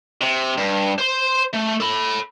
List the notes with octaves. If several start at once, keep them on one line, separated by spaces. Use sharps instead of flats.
C3
G2
C5 C6
A3
A4 B5